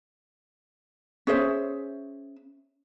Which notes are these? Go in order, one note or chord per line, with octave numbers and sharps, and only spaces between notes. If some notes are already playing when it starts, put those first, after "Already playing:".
C#4 G#4 C5 E5